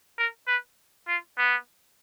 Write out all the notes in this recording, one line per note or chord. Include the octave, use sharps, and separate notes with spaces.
A#4
B4
F4
B3